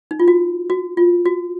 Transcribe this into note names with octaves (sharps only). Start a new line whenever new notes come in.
D#4
F4
F#4
F#4
F4
F#4